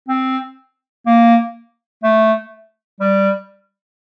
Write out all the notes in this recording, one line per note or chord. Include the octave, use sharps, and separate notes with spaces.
C4
A#3
A3
G3